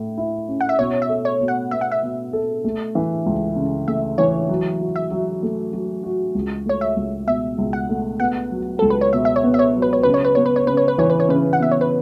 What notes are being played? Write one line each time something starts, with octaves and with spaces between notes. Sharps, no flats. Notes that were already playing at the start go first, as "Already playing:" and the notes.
Already playing: A2 A3
E4
C#4
F#5
E5
B2 C#5
E5
A4
C#5
B2
F#5
B3 E5
F#5
E5
B2
A4
A3
E3
C#2
C#3
A3 E5
E3 C#5
F#3
F#4
E5
F#3
A3
F#3
F#4
C#2
A3 C#5
E5
C#2
B2 E5
C#2
F#5
A3
B3 F#5
F#3
C#2 A4
B4
C#5
B2 E5
E5
C#5
B3
E5
C#5
F#3
B4
C#5
C#3 B4
C#5
B4
B3 C#5
B4
C#5
C#3 B4
C#5
B4
E3 C#5
B4
C#5
C#3 B4
F#5
B3 E5
C#5
B4